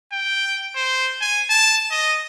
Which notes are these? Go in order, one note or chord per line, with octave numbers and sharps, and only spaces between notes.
G5
C5
G#5
A5
D#5